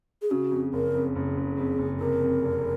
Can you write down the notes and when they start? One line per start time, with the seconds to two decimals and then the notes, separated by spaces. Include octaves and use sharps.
0.22 G#4
0.31 C#3 F#4
0.52 F2
0.73 F#1 A#4
0.94 F2
1.16 F#1
1.37 F#1
1.57 F2 G#4
1.79 F#1
2.00 C3 A#4
2.21 F2
2.42 F1